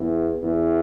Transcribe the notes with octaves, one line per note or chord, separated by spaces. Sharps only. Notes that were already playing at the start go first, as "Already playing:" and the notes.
Already playing: E2
E2